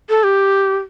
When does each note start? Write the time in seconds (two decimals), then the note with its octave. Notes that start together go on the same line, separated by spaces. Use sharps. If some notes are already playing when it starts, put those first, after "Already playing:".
0.09 A4
0.24 G4